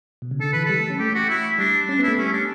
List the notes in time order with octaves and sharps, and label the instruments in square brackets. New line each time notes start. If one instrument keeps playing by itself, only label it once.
[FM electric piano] B2
C#3
[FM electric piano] D3 [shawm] A4
[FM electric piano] E3 [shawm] B4
[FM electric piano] G3 [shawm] A4
[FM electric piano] A3
C#4
[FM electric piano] A3 [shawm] G4
[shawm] F#4
E4
[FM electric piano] G3 [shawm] D4
[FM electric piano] C#4 [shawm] D4
[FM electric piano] B3 [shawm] E4
[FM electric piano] A3
[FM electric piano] G3 [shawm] C#4
[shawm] D4